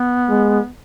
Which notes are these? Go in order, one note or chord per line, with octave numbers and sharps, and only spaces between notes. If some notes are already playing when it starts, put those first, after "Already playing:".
Already playing: B3
G#3